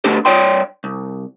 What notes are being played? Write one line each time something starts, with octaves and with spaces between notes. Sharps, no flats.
D3 A3 B3 D4 G4 A4
G2 F#3 C#5 D5 G5 C6
C2